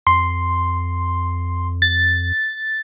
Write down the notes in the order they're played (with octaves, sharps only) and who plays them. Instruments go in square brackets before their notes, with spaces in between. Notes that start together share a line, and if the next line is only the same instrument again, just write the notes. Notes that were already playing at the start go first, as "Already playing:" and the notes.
[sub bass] F2 [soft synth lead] C6
[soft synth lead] A6